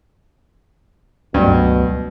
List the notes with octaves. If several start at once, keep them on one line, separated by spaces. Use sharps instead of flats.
C#2 G2 B2 F#3 G3 A3